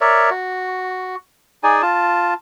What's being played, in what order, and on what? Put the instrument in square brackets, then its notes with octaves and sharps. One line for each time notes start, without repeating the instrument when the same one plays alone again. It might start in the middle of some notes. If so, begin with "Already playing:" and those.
[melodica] A#4 C#5 D5 E5
F#4
D#4 G#4 D5 G#5
F4 A5